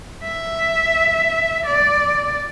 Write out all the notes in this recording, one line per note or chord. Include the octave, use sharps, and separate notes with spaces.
E5
D5